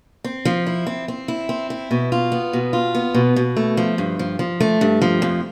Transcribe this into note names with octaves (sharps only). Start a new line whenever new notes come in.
C4
F3
E4
C4
C4
E4
C4
E4
B2
F4
B3
B2
F4
B3
B2
B2
A3
F3
G2
F3
F3
A3
G2
F3
F2